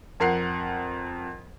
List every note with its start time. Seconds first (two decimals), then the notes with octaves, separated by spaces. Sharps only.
0.20 F2 A#4 F#5 C7